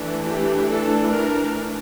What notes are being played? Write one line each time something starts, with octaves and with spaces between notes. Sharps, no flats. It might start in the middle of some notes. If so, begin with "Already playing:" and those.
Already playing: E3 A3 D4
G4
A4
A#4